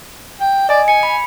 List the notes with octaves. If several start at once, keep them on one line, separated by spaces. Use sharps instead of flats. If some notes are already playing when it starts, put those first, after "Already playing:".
G5
D5 D#5 G#5
G#5 C#7
B5